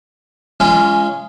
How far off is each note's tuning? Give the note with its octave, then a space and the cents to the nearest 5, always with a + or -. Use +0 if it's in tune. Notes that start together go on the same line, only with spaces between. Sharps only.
G#3 +0 C#4 +10 F4 -35